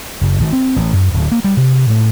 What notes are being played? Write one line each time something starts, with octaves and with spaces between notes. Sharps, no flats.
F#1
G#1
C4
A1
F#2
D1
A#3
G3
C3
A2